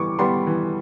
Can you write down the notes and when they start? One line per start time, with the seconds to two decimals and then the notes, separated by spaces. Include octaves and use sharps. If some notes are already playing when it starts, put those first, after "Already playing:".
Already playing: E3 G3 B3 C#6 D6
0.19 G3 B3 C6
0.47 E3